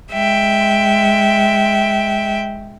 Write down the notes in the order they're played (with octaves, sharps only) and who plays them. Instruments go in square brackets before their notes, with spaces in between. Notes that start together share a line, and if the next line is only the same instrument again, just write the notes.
[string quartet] G#3 E5 G5